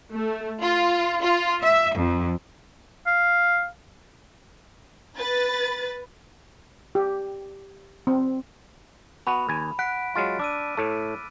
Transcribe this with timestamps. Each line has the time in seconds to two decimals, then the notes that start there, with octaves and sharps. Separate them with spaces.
0.12 A3
0.62 F4
1.22 F4
1.63 E5
1.98 F2
3.07 F5
5.17 B4 A6
6.95 G4
8.07 C4
9.27 B3 F#4 A5 B5
9.49 D#2 G#5
9.79 F#5 F#6 B6 D7
10.15 F#3 G#3 F4 B5 F6 A6
10.40 D4 D6 E6 D#7
10.77 A2 A3